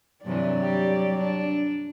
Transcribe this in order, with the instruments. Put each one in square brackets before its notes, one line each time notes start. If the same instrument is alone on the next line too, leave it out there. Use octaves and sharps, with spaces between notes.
[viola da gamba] G2 C3 E3 [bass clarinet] F#3 [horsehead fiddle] D5
[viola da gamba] G3 G4
D4